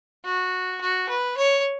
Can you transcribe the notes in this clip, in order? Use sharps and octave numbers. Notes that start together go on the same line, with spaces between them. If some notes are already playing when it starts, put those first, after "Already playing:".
F#4
F#4
B4
C#5